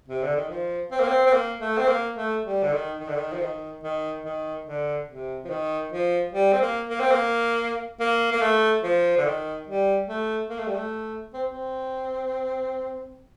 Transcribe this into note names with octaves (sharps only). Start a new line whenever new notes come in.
C3
D3
D#3
F3
C4
A#3
C4
C4
A#3
A3
C4
A#3
A3
G3
D3
D#3
D#3
D3
D#3
F3
D#3
D#3
D#3
D3
C3
F3
D#3
F3
G3
C4
A#3
A#3
C4
A#3
A#3
A#3
A3
F3
D3
D#3
G3
A3
A#3
A3
G3
A3
C4
C4